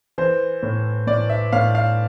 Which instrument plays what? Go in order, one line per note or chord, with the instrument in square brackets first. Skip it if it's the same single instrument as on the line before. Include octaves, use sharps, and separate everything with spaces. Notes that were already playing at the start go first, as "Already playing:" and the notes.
[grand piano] E3 C5
A2
A2 D5
E5
A2 F5
F5